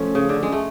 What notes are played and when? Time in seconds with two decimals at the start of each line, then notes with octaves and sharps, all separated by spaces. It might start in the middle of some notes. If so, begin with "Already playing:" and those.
Already playing: F3 A3 C#4
0.15 C#3
0.29 D3
0.43 G#3
0.52 A3